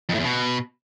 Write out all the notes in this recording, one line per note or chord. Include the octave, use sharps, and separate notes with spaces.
F2
A2
E2
B2